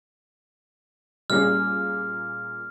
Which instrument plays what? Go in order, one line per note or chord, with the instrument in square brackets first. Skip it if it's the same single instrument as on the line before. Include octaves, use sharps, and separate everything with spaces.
[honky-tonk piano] A#2 A#3 G#4 [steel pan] G3 C#4 [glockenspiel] F6